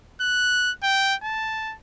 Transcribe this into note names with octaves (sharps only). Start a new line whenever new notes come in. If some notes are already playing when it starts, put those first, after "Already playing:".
F#6
G5
A5